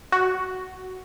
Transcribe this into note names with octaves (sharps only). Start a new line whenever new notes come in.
F#4